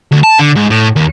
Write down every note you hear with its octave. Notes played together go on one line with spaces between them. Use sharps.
D2
A5
D3
G#2
A2
D#2